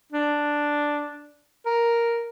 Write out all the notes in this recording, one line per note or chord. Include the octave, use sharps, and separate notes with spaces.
D4
A#4